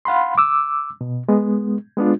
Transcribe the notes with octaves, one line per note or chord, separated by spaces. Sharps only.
F5 F#5 B5 C6
D6 E6
B2
G#3 B3
G#3 B3 D4 F4